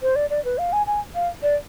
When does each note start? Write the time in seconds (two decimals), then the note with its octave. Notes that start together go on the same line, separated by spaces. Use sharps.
0.02 C5
0.16 D5
0.30 D5
0.45 B4
0.58 F5
0.73 G#5
0.87 G#5
1.15 F5
1.42 D5